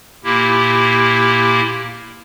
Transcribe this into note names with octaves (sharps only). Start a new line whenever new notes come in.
A#2 A#3 E4 G4